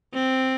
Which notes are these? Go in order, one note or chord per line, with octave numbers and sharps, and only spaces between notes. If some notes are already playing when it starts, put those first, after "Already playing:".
C4